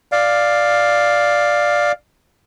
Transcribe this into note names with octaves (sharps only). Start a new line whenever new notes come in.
D5 F5